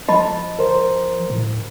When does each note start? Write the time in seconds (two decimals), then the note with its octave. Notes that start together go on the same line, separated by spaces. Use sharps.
0.08 F3 D#5 A5 B5
0.59 A#4 C5
1.30 A2